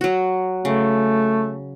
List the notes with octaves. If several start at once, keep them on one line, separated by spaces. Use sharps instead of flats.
F#3 F#4
C#3 A3